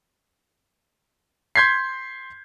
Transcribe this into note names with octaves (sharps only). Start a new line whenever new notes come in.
C6 G6 G#6 B6 C7